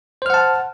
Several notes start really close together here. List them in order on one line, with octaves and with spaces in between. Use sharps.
C5 F6 F#5 A5